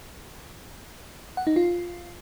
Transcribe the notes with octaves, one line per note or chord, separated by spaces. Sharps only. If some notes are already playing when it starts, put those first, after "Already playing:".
F#5
D#4
F4